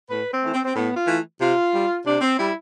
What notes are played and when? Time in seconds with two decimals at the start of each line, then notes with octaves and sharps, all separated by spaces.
0.10 A2 B4
0.31 C4
0.42 E3 A3
0.54 C4
0.64 C4
0.75 A2 B3
0.96 F4
1.07 E3 A3
1.40 C3 F4
1.73 G3
2.05 C3 D4
2.21 C4
2.38 G3 E4